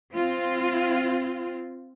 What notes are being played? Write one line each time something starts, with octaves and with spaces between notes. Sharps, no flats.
C4 F4